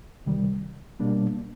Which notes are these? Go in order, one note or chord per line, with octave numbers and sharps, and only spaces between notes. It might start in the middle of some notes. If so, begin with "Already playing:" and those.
C2 C3 D#3 G3
B2 G3 A#3 D4